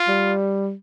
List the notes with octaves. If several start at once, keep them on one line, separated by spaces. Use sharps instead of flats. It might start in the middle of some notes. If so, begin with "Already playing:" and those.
Already playing: F4
G3